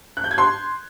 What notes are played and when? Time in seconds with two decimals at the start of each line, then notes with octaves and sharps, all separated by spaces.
0.17 F#6
0.24 G6
0.31 G#6
0.38 C6